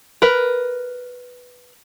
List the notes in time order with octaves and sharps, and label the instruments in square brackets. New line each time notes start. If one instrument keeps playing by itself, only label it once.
[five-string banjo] A#4 B4